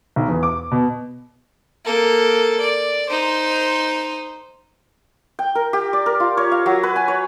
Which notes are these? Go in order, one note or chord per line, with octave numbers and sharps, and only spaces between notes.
B1
E2
D6
B2
A#3 A4
D5
D#4 C5
G5
A#4
G4
D5
A#4
F4
C#5
F5
F#3
B4
G#5
C#5